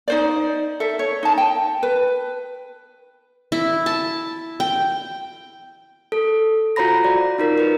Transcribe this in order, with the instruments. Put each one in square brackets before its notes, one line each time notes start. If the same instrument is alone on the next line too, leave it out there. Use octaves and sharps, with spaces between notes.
[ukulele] D#4 C5 D5
A4 E5
C#5
D#4 A5
G5
B4
[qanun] E4
A5
G5
[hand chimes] A4
F4 F#4 C5 A#5 B5 A#6
D5
D#4 F4 A#4
A#4 B4